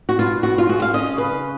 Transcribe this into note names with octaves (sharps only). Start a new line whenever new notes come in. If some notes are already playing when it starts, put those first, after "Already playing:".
F#4
B2 F4
B2 F#4
F4
G#3 F#4
F5
C#4 D#5
C#3 B4